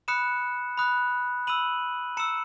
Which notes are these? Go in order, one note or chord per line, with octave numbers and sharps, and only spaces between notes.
B5 D#6 F#6 C#7 E7
B5 D#6 F#6
B5 E6 D#7 F#7
A#5 E6 C#7 E7